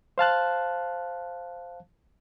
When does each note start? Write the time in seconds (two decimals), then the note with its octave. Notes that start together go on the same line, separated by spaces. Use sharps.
0.18 C5 F5 A5 F#6